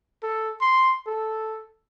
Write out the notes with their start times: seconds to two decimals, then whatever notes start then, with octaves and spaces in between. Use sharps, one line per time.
0.23 A4
0.61 C6
1.07 A4